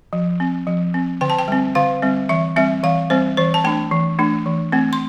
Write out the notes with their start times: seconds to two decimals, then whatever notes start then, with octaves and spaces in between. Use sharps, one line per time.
0.13 F3
0.40 C4
0.67 F3
0.94 C4
1.21 D3 G5
1.30 A5
1.39 G5
1.48 G3 C4
1.75 D3 F5
2.02 G3 C4
2.29 E3 E5
2.56 G3 C4 E5
2.84 E3 F5
3.10 G3 C4 C5
3.37 E3 C5
3.54 A5
3.64 A3 D4 G5
3.91 E3
4.19 A3 D4
4.46 E3
4.72 A3 C4
4.93 C6